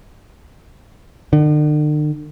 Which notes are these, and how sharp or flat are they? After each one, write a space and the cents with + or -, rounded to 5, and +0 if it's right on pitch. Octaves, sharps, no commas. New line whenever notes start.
D3 +45